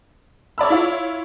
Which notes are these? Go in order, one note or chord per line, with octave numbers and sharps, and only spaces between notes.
C#5 D5 B5 E6
E4 F4 C#5